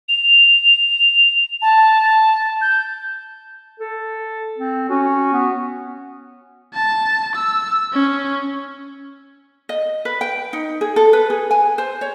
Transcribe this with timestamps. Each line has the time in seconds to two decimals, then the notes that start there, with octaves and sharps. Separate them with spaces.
0.09 F7
1.62 A5
2.61 G6
3.80 A4
4.58 C4
4.89 C#4 F#4
5.33 B3
6.74 A5
7.35 E6
7.93 C#4
9.69 D#5
10.05 B4
10.21 G5
10.53 D#4
10.81 G#4
10.96 A4
11.13 B4
11.30 G#4
11.51 G#5
11.78 C5
12.01 C#5